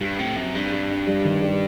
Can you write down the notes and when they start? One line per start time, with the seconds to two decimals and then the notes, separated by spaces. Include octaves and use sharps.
0.01 G2 G4
0.19 A2 C4
0.36 F#2 C4
0.54 G2 G3
0.72 G3
0.90 D4
1.07 G3
1.25 D#3
1.42 G3